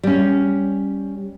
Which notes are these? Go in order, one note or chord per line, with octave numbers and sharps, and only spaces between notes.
G3 C#4